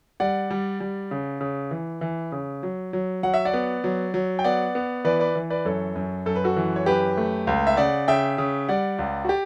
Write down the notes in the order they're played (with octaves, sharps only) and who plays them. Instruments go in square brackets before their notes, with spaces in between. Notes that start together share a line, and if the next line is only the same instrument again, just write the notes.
[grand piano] G3 D5 F#5
G3
G3
C#3
C#3
E3
E3
C#3
F#3
F#3
F#3 F#5
E5
D5 F#5
B3
F#3
F#3
G5
B3 D5 F#5
B3
E3 B4 D5
B4 D5
E3
B4 D5
F#2 A4 C#5
F#2
F#2 A4
B4
F#4 A4
E3
C#5
F#2 G4 B4
A3
C#2
E5
C#3 D5 F#5
C#3 E5 G5
C#3
G3 D5 F#5
C#2
F#4
G4